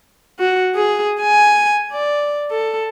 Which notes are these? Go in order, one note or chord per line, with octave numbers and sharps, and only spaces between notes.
F#4
G#4
G#5
D5
A4